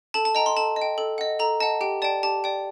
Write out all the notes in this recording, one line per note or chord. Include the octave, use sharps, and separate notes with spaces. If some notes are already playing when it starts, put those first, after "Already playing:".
A4 A5
A5
D#5 G5 A#5
C6
A4 A5
D#5
G5
A4
D#5 F#5
A4 A#5
D#5 F#5 A5
G4 G5
D5 G5 A5
G4 A5
D5 G5